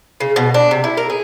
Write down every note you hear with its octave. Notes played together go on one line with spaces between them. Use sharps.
C#3
B2
D4
C3
E4
A#4
G#4